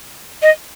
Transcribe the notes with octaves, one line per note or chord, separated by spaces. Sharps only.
D#5